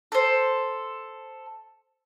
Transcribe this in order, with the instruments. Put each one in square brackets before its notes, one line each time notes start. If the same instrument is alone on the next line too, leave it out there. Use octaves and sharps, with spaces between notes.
[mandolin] A4 C5